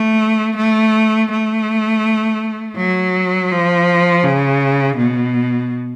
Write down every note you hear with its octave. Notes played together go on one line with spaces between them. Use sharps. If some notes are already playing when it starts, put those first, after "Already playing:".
Already playing: A3
A3
A3
F#3
F3
C#3
B2